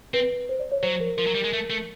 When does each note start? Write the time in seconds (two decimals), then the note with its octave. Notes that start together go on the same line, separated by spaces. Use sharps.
0.14 C4 B4
0.49 C5
0.60 D5
0.72 C#5
0.83 F#3 C5
1.00 A#4
1.17 F3 A#4
1.27 F#3
1.35 G3
1.44 G#3
1.53 A3
1.70 A3